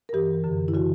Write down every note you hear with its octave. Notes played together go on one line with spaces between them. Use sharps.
A#4
G2 E3 G4
F#2 D3
E4
C#3 E3 F#4